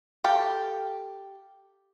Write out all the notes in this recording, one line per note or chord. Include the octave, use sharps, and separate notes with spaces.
G4 A4 F5 G5